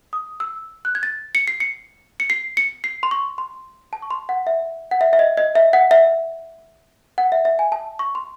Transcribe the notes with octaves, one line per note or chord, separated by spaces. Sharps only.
D#6
E6
F#6
G#6
A6
C#7
C7
C#7
C#7
C7
C#7
C7
C6
C#6
C6
A5
C#6
C6
F#5
E5
F#5
E5
E5
D#5
D#5
E5
F#5
E5
F#5
E5
E5
G#5
A5
C#6
C6